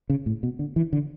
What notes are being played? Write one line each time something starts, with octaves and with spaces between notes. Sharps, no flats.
C#3
A2
B2
D3
E3
D3